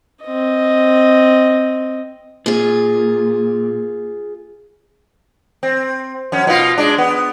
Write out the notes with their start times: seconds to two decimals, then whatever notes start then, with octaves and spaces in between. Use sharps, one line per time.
0.25 C4 D#5
2.46 A#2 F4 G#4
5.63 C4
6.32 F#2 C#4
6.47 B2 F4
6.78 G#3 D4
6.98 B3